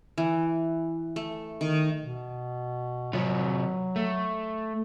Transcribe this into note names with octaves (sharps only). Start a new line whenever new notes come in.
E3
A3
D#3
B2
C3 F#3 F4 F#4
A3